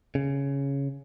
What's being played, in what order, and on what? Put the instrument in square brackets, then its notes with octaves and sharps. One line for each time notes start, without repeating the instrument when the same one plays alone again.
[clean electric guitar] C#3